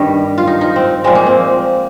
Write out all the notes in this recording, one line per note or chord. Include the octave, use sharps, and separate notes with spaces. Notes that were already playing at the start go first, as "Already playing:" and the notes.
Already playing: G2 D#3 G3
F4
D#4
D#4
C4
A#2 F3 G#3 C4
A#3
C4